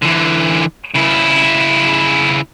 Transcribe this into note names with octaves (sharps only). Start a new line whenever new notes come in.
D3 E3
C#3 E4